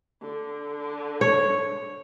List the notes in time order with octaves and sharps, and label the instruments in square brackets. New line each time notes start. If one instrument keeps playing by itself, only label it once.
[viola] D3
[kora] C#5